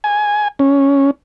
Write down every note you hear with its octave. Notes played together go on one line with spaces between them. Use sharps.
G#5
C#4